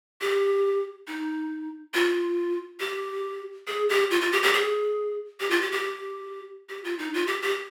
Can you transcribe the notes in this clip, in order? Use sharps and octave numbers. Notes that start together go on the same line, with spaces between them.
G4
D#4
F4
G4
G#4
G4
F4
F4
G4
G4
G#4
G4
F4
G4
G4
G4
F4
D#4
F4
G4
G4